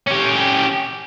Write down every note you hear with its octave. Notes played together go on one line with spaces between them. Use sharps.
C#4 G4